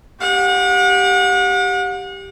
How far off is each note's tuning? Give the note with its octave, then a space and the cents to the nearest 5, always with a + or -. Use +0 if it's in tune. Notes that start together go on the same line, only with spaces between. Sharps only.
G4 +0 F#5 -40